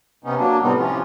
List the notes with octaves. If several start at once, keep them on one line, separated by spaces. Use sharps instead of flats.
C3 B3 C#4 D#4
F#3 A#3 D4
A2 C3 G3 B3 C4 D#4
C3 E3 F3 C#4 F4